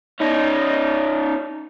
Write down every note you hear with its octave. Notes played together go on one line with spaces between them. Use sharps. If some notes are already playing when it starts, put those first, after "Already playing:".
C#4 D#4